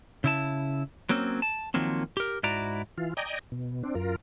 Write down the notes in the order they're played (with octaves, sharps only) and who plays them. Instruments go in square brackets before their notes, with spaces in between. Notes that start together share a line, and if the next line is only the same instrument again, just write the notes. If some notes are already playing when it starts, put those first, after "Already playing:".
[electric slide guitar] C#3 E4 A5
F#3 A#3 C4 C#4
A5
D#3 F3 F#3 A#3 C4
G4 A#4
G#2 E4 F#4 D5 A#5
[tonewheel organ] E3 F4
D5 D#5 G5 G#5 A#5
B2
C4 D4
F#2 F4 A#4